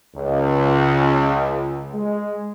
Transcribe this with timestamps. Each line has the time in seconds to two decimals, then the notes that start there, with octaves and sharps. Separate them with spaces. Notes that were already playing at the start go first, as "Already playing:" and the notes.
0.16 C#2
1.94 G#3